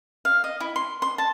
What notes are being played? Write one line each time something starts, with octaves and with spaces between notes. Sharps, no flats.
F5
D#5
E4
C6
C6
A5